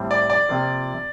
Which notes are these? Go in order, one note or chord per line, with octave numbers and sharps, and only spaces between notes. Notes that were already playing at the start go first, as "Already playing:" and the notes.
Already playing: A2 G3 C4
D5
D5
C3 F3 A#3 F4